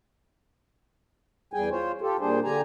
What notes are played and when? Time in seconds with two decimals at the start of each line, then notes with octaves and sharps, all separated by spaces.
1.53 E2 G3 G#4 G5 G#5
1.71 F4 C5 C#5
2.01 F4 G4 A4
2.20 A#2 G3 D4 G#4 C5
2.44 D3 G4 G#5 A#5